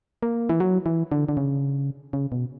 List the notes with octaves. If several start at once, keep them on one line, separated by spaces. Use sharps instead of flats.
A#3
E3
F#3
E3
D3
D3
C#3
C#3
B2